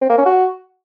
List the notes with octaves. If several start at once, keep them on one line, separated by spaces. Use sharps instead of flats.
C4
A#3
C#4
F#4